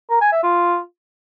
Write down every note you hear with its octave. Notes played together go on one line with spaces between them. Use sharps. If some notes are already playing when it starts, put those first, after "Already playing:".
A#4
G#5
E5
F4